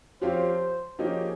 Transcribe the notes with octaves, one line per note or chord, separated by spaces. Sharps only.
F3 C4 G4 C5 C#5 F5
F3 A#3 D#4 G4 G#4 C#5